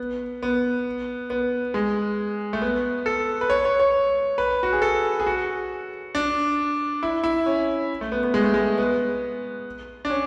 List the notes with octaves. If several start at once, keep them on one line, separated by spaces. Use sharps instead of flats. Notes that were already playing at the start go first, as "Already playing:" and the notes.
Already playing: B3
B3
B3
G#3
A3
B3
A4
B4
C#5
C#5
C#5
B4
F#4
G#4
A4
G#4
F#4
D4
E4
E4
C#4
A3
B3
B3
G#3
A3
G#3
B3
D4
C#4